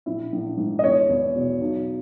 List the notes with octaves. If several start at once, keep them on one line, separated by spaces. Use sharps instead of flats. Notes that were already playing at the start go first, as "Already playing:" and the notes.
A#1 E4
A#1
G#2
D#5
E2 C#5
E2
B2
B1